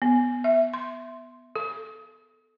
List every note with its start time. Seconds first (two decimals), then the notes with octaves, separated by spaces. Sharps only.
0.02 B3
0.44 E5
0.74 C6
1.56 A4